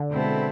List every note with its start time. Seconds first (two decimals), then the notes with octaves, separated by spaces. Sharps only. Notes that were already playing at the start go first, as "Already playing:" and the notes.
Already playing: D3
0.11 B2 G#3 C4 E4 A4